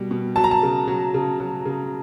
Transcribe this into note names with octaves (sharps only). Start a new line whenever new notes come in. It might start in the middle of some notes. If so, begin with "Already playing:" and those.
Already playing: B2 G3
B2
F#3 A5
A#5
A5
C#3
F#3
C#3
F#3
C#3